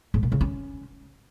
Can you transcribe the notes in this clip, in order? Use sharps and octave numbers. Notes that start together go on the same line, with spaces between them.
G#2
A#2
C#3
C#4